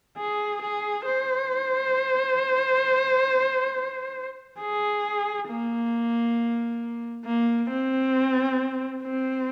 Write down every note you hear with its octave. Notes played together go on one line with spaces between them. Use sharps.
G#4
G#4
C5
G#4
A#3
A#3
C4
C4